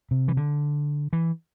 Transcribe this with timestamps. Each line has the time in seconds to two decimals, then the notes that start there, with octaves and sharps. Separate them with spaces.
0.11 C3
0.28 E3
0.37 D3
1.13 E3